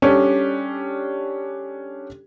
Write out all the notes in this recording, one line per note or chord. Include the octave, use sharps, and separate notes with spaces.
G3 C#4 D4 G4 A4